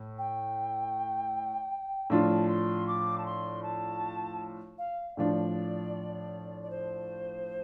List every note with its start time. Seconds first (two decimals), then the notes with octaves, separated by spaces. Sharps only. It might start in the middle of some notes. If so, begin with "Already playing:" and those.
Already playing: A2
0.18 G5
2.10 A2 F3 D4 F4 A5
2.49 C6
2.88 D6
3.18 A5
3.26 C6
3.63 A5
4.78 F5
5.17 A2 F3 D4 D5
6.63 D5
6.70 C5